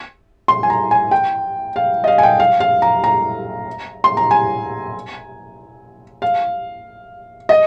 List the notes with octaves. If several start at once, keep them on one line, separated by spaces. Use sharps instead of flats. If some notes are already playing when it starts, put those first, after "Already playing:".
C6
G#5
A#5
G#5
G5
F5
D#5
F5
G#5
G5
F5
F5
A#5
A#5
C6
A#5
G#5
F5
D#5